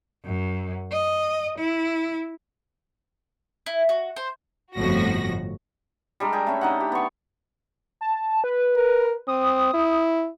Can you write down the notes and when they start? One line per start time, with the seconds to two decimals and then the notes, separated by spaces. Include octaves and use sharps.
0.25 F#2
0.92 D#5
1.58 E4
3.66 E4
3.89 F#4
4.16 C5
4.76 G1 F2 A2 F#4 A#6
6.20 G3 G#3 D4 A#4
6.32 G#4 A#4 G5
6.47 A3 C#4
6.61 D3 D#4 F#5
6.80 G4
6.92 B3 C#6
8.01 A5
8.44 B4
8.75 A#4
9.28 C4 D#6
9.74 E4